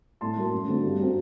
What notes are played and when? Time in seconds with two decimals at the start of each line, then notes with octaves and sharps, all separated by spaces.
0.21 A2 A5 C6
0.37 F#3 A#3
0.52 F#2
0.67 D3 A3 C4
0.84 G2
0.99 F#3 C4